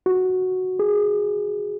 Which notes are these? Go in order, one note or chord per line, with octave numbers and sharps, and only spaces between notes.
F#4
G#4